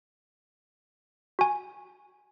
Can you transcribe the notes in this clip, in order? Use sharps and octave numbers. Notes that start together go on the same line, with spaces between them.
F#4 G#5